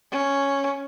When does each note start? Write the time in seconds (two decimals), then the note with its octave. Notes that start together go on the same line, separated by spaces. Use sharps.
0.12 C#4